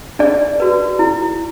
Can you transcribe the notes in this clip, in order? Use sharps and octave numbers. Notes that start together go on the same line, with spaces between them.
D4 D5
F#4 B4
E4